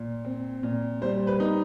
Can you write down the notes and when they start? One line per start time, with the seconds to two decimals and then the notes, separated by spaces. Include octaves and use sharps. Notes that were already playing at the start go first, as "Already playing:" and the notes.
Already playing: A#2
0.25 C4
0.63 A#2
1.02 G3 C5
1.27 B4
1.40 D#4